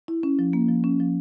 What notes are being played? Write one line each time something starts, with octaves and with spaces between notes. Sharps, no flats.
E4
C#4
F3
A#3
F3
C#4
F3